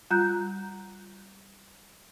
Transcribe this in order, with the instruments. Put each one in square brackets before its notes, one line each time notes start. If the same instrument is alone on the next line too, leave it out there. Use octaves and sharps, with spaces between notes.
[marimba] G3 F4 A#5 F#6 G6